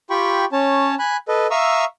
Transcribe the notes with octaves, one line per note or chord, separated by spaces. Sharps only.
F4 G4 G5 B5 C#6
C#4 C#5 A5
G#5 B5 F#6
A4 B4 D#5
E5 F5 A#5 C#6 D#6 E6